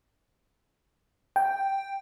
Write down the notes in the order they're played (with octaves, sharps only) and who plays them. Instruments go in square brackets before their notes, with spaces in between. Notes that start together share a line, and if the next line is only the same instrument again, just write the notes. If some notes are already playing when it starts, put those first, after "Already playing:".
[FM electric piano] G5